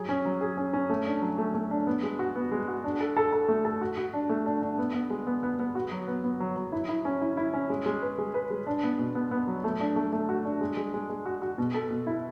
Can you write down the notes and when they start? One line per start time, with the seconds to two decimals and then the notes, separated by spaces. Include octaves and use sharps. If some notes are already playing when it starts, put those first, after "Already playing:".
Already playing: F#3 G#4
0.09 C#4
0.25 F#3
0.41 G#4
0.57 C#4
0.73 C#4
0.90 A3
1.06 D4
1.22 F#3
1.38 A3
1.54 A3
1.71 D4
1.87 B3
2.03 G#3
2.19 F#4
2.36 B3
2.52 G#3
2.68 F#4
2.84 D4
3.00 A4
3.17 A4
3.32 A4
3.48 A3
3.65 A4
3.81 F#4
3.97 F#4
4.13 D4
4.30 A3
4.46 D4
4.62 D4
4.78 B3
4.95 B3
5.10 G#3
5.27 B3
5.43 B3
5.59 B3
5.75 F#4
5.92 F#3
6.08 B3
6.24 B3
6.40 F#3
6.56 F#3
6.72 E4
6.89 E4
7.05 C#4
7.21 E4
7.37 E4
7.54 C#4
7.70 G#3
7.86 G#3
8.02 B4
8.18 G#3
8.34 B4
8.51 G#3
8.67 D4
8.83 B3
8.99 B2
9.15 B3
9.31 B3
9.47 F#3
9.64 A3
9.80 D4
9.96 A3
10.13 A3
10.29 F#4
10.45 D4
10.61 G#3
10.77 G#3
10.94 G#3
11.10 G#3
11.26 F#4
11.42 F#4
11.58 B2
11.74 A4
11.90 B2
12.07 E4